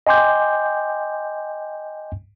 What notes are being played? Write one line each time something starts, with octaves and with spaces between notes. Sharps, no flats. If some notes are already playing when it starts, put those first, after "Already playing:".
D#5 G5 G#5 C6 D6 G6